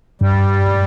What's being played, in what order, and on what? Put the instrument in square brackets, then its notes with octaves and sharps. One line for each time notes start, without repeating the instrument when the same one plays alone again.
[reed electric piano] G2 [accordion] G3